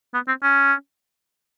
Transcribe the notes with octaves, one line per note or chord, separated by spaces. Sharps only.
B3
C4
C#4